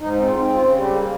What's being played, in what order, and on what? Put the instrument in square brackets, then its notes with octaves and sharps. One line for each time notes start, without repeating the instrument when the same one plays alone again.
[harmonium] G#2 D#4
C4
F4
C4
C#3 F4
G3
G4
A#3